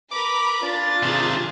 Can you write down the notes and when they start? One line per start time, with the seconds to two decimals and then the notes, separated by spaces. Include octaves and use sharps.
0.11 A#4 B4 B5 D6
0.63 D4 F4 A6
1.03 C3 D#3 G#4